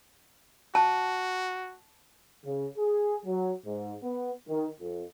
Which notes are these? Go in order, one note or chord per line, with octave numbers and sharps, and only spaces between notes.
F#4 A5
C#3
G#4
F#3
G#2
B3
D#3
F2